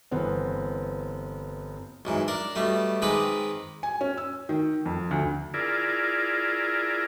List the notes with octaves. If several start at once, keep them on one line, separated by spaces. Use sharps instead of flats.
G1 E3 B3 C4
B1 G#2 E3
D4 A#4
B2 G3 A3
D#3 G#3 C4 G#4 B4 D6
G#5
C#4
E6
D#3
F2
D2
E4 F4 G#4 A#4 D5